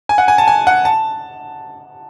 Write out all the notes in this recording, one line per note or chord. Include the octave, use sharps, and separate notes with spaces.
G#5
F#5
G#5
A5
G#5
F#5
A5